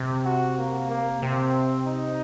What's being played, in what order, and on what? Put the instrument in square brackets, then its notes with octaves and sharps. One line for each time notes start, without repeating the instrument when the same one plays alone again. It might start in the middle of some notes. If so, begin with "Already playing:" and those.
Already playing: [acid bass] C3
[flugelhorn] F#4
A#3
A#3
[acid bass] C3 [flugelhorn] C4
[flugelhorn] D#4